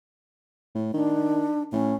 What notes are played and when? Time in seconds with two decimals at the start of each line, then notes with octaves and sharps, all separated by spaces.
0.75 A2
0.94 D#3 D4
1.73 A2 C#4